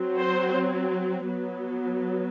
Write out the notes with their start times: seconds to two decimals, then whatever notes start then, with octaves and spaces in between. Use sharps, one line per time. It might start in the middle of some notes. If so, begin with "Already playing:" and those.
Already playing: F#3 C4
0.19 C5
1.28 F#3 B3